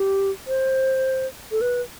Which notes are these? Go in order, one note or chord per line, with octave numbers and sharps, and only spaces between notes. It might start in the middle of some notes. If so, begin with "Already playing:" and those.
Already playing: G4
C5
A4
B4